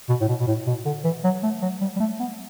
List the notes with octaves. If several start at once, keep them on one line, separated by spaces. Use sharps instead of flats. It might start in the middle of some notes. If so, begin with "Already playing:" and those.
B2
A2
B2
B2
A2
B2
D3
E3
F#3
A3
F#3
G3
G3
A3
B3